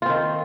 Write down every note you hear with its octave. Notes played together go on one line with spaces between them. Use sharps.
D#3 C4 F4